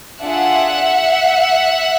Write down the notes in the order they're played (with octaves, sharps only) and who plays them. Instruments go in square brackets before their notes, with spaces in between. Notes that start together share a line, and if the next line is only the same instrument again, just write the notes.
[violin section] D4 F4 G#4 E5 F#5